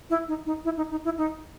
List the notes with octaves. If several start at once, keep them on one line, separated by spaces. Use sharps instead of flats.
E4
D#4
D#4
E4
D#4
D#4
E4
D#4